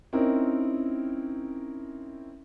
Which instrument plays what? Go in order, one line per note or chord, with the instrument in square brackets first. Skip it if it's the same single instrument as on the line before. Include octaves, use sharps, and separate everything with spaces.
[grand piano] C4 C#4 D#4 E4 A#4